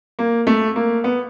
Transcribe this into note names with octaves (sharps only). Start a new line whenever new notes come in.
A#3
A3
A#3
B3